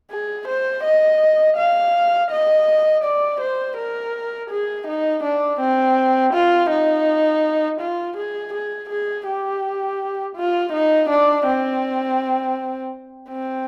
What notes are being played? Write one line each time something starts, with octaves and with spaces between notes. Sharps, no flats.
G#4
C5
D#5
F5
D#5
D5
C5
A#4
G#4
D#4
D4
C4
F4
D#4
F4
G#4
G#4
G#4
G4
F4
D#4
D4
C4
C4